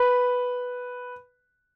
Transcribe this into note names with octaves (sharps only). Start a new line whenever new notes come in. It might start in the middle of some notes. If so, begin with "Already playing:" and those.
Already playing: B4